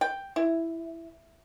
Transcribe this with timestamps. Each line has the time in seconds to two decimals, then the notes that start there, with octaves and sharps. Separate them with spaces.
0.01 G5
0.36 E4